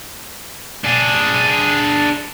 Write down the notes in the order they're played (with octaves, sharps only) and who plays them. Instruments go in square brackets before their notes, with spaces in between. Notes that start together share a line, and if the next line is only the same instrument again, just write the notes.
[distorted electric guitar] D4 G#4